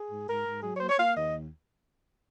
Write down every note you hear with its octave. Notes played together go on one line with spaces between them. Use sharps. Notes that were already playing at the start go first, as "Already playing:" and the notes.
Already playing: G#4
G#2
G#2 A#4
G#2
F#3 G#4
C#5
A#3 C5
C#5
A#3 F5
D#2 D#5